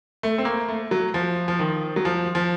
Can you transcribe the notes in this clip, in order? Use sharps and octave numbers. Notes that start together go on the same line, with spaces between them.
A3
C4
A#3
A3
F#3
F3
F3
D#3
F#3
F3
F3